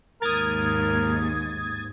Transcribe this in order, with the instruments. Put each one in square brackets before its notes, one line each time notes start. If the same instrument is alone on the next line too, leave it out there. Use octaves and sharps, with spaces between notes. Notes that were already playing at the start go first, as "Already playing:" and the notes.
[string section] D#2 G#2 [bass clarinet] A#4 [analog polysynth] D#6 G#6 A6